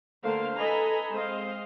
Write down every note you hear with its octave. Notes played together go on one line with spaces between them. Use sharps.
D3 A3 A#3 A#4 C5 F5
A4 B4 D#5 G#5 A#5 B5
G#3 C4 C5 D#5 F5